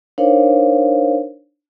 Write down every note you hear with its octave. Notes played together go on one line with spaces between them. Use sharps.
D4 D#4 A#4 C5 C#5 F5